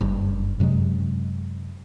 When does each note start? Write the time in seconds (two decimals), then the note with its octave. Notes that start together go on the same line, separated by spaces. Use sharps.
0.01 F#1 G2
0.60 F#2 C3 F#3 G#3